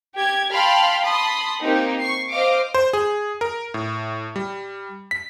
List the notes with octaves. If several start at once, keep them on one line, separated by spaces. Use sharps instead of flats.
G4 G#6
F5 G5 A5 B5 C6 F6
A5 B5 C6 D#6
A#3 C4 D#4 G4
C#6 C7
C5 D#5 F5 D6
C5
G#4
A#4
A2
G3
B6